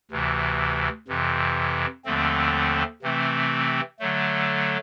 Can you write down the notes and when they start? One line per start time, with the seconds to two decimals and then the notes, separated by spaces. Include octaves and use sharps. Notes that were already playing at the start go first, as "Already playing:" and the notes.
0.11 D2 C3 E3
1.08 F2 C3 E3
2.04 D#2 D3 F3 A3 C4
3.03 C3 E3 A3 C4
3.99 D3 F#3 A3